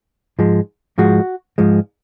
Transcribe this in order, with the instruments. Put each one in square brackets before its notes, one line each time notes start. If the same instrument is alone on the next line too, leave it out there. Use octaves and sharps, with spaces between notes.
[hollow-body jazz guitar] G#2 F3 G#3
G#2 F3 G#3 F#4
G#2 F3 G#3